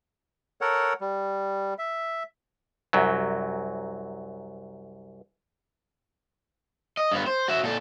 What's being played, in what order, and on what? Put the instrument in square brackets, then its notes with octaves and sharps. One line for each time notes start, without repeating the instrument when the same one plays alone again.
[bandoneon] A4 A#4 C#5 F#5
G3
E5
[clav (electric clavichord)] C2 F#2 F#3
[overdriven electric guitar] D#5
G2 B3
C5
F#4 E5
A#2 A4